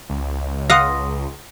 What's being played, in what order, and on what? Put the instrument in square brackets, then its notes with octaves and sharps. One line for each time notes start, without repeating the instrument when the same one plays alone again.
[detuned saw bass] C#2
[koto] F5 F#5 [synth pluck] C6 D#6 A#6